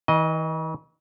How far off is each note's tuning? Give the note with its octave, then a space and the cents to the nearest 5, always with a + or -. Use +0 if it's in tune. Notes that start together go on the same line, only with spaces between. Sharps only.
E3 -45 D#5 +0